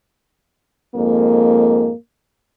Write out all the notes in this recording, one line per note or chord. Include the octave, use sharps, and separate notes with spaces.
F2 G#2 A#3